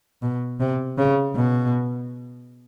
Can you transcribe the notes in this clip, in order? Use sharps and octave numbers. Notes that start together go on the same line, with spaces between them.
B2
C3
C#3
B2